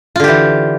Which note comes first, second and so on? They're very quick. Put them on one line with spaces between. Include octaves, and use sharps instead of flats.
F4 D3 G4 E3